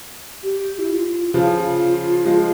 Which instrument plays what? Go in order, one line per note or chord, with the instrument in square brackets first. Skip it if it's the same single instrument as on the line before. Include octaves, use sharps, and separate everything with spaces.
[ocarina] G4
E4
F4
[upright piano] C#3 F3 [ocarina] F4
[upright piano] F3 G#3